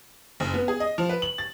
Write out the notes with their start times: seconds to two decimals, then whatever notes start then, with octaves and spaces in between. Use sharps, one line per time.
0.40 F#1
0.54 B3
0.68 G#4
0.80 D#5
0.98 F3
1.09 B4
1.22 F#7
1.38 A6